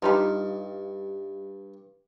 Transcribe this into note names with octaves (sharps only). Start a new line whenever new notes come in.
G2 G3 D#4 F4